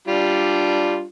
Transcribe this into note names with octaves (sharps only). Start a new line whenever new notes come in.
G3 D4 F4